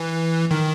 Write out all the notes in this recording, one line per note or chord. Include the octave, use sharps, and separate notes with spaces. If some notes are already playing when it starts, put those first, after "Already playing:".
Already playing: E3
D#3